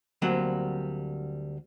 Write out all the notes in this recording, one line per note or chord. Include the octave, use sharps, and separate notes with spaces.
D2 F#3 G3 A#3 C4 F#5